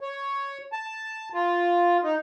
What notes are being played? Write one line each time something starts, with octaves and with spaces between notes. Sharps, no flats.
C#5
A5
F4
D#4